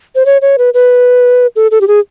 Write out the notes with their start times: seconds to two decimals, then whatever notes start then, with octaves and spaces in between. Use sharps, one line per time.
0.15 C5
0.26 C#5
0.42 C#5
0.58 B4
0.74 B4
1.56 A4
1.71 A4
1.81 G4
1.88 G#4